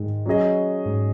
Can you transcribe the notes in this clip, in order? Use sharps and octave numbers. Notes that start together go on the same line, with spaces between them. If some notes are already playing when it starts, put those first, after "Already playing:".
Already playing: G#2 D#3 G#3
F#3 C#4 G#4 D#5
G#2